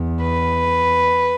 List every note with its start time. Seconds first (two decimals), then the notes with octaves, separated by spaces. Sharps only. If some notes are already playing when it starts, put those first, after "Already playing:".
Already playing: E2
0.22 B4